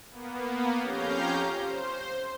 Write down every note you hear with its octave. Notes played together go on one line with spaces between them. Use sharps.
A#3 B3
F2 C#4 G4 F5 A#5 G6
C5